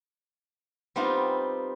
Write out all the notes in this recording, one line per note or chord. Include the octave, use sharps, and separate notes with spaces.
G3 B3 C4 D#4 F4